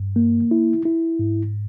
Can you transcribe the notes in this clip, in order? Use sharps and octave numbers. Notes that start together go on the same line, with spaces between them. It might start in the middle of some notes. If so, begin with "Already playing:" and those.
Already playing: G2
A#3
E4
E4
G#2